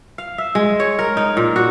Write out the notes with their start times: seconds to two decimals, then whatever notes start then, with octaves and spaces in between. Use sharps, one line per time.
0.18 F5
0.38 E5
0.55 G#3
0.80 C#5
0.99 A#4
1.17 D#4
1.37 A#2
1.56 F#4